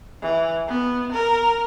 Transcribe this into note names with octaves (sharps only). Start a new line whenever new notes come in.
E3
B3
A#4